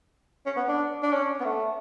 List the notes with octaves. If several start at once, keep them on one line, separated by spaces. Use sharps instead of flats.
C#4
B3
D4
D4
C#4
B3
A3